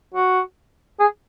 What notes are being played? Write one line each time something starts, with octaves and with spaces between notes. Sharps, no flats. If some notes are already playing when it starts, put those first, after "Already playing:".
F#4
G#4